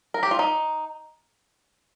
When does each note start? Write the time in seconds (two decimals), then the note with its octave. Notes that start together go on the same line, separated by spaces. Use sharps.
0.14 A#4
0.23 G4
0.31 F4
0.39 D#4